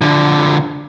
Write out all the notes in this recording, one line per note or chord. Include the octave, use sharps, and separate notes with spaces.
D3 F3